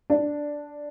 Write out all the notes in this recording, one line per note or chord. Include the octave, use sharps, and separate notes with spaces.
D4